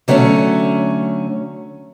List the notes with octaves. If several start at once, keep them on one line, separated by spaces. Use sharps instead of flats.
D3 F#3 A3 C4 C#4